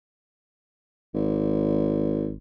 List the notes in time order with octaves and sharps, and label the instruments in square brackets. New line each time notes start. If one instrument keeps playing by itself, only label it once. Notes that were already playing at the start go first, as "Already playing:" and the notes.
[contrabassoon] G#1